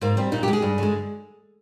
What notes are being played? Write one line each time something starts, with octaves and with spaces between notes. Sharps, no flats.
G#2 A#3
G3 C4
A#2 D#4
G4
G#3
G#4
G2
D3 G#3